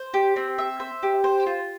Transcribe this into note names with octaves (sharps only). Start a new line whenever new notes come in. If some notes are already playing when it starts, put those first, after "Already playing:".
Already playing: C5
G4
C4
E5
C5
G4
C5
F4